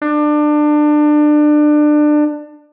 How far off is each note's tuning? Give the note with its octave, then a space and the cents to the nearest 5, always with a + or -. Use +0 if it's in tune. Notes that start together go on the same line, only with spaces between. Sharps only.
D4 +25